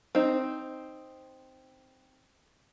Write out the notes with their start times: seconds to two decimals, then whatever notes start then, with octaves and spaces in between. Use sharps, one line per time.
0.15 C4 D#4